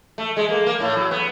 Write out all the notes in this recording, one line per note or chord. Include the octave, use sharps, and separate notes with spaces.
A3
G#3
A#3
A#3
A2
F#3
B3